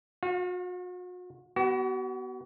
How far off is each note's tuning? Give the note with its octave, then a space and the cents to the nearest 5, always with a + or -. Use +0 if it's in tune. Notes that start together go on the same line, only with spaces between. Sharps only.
F#4 -40 F5 +25
B3 +0 F#4 +40